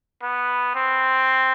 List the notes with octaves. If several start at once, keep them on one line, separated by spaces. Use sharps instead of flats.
B3
C4